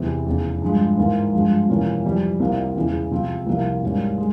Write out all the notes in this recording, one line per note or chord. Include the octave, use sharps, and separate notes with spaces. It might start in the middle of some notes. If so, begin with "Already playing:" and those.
Already playing: E2 C3 E3
F1 E2 C#3
G2 F3 G#3
G#2 E3 A#3 F4
G2 F3 G#3
F2 C3 E3 A#3 C#4
F2 E3 G3
C2 C3 G3 A#3 F4
E1 E2 C#3 E3
F2 C3 F3 C4 F4
C2 C3 F3 A#3
G#2 G3 A#3 C#4
G#3